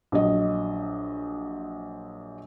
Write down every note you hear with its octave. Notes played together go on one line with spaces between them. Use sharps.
A#1 F#3 D#5